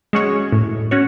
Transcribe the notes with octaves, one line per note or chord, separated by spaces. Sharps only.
G#3 C#4 F#4 C#5
A2
C#4 F#4 C#5